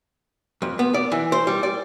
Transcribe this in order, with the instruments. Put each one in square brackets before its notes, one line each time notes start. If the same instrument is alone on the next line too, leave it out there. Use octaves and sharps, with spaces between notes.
[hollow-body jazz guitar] F2
B3
D5
E3
C5
G3
D5